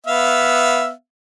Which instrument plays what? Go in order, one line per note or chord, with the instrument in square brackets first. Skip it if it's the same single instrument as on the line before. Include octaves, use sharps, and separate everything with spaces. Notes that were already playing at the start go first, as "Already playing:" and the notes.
[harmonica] B3 E5 F5